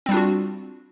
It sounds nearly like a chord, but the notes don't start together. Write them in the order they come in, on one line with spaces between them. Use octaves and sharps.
C4 G3 D4 F4 F#4